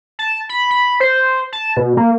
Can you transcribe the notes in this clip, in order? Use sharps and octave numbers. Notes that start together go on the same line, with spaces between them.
A5
B5
B5
C5
A5
B2
A#3